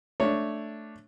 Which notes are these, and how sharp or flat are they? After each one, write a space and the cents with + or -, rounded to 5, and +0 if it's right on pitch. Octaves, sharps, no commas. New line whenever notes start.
A3 +0 D4 +0 C#5 +0